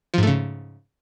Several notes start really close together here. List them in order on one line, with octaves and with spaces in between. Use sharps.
F3 G#2 A3 C#3